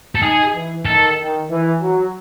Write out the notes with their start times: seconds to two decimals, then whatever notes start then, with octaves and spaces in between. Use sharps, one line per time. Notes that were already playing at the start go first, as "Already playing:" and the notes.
0.15 A4
0.22 D#4 G#4
0.54 E3
0.86 D#3 A4
1.18 D#3
1.50 E3
1.81 F#3